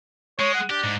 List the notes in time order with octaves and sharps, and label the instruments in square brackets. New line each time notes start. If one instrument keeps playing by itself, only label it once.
[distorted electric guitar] G#3 [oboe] C#5
[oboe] F#5
[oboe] D4 [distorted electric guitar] G4
[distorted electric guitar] G#2